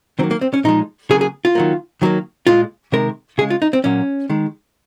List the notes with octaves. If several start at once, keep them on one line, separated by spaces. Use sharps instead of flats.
D#3 F#3 A#3 C4
A#3
C4
C#4
A#2 F3 G#3 D#4
C#3 F#3 A#3 G#4
G#4
F4
D#3 F#3 A#3
D#3 F#3 A#3
A#2 G#3 F4
C3 D#3 G#3 A#4
C#3 G#3 G#4
F4
D#4
C4
A#2 F#3 A#3 C#4
D#3 G#3